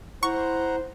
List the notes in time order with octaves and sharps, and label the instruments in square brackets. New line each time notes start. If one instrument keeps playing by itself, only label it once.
[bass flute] E4 [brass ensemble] C5 [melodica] F#5 A#5 [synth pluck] C#6